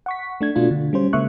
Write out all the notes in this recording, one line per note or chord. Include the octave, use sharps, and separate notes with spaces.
F#5 C#6 B6
A3 D4 G#6
B2 A3 D4 F4 F#4
D3
G3 C#4 C5
C#3 G#3 A#3 E5 C#6 F#6